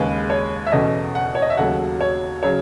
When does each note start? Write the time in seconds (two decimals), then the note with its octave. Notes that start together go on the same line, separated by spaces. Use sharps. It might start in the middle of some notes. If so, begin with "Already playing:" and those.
Already playing: D#2 C#3 G#3 B4
0.30 C#5
0.66 E5
0.72 E2 B2 A3 C#4 D#5
1.15 F#5
1.35 C#5
1.42 D#5
1.50 E5
1.57 D#2 C#3 F#3 A3 F#5
2.01 C#5
2.43 C#3 F#3 C#5